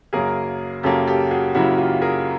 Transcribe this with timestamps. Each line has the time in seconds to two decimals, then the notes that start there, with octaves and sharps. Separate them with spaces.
0.13 F#2 C#3 F#3 A#3 G#4 A#4
0.83 F#2 C#3 F#3 A#3 G4 A4
1.07 G4 A4
1.31 F#4 G#4
1.54 F#2 C#3 F#3 A#3 E4 F#4
1.78 F4 G4
2.02 G#4 A#4